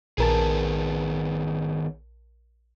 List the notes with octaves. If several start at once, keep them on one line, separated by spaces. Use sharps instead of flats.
A#1 D#3 B3 G#4 A#4 A5